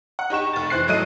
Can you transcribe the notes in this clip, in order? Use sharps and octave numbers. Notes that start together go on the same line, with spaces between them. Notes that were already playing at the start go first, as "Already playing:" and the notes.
F#5
D#4 G4 C#6 E7
F1 A6
E3 C5 F#6 C7
G#1 F#3 A3 D#5 D#7